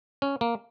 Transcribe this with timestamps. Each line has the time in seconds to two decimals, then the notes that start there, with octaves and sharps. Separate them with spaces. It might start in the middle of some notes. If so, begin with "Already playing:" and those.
0.22 C#4
0.41 A#3